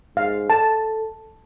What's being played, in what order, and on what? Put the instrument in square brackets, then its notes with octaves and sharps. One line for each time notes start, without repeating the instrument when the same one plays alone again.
[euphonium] G#2 [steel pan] F5
[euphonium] A4 [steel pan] A5